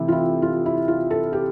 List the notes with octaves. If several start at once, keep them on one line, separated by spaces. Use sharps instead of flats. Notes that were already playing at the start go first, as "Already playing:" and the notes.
Already playing: C3 E3 A3 C4 E4
F4
E4
F4
E4
F4
A4
G4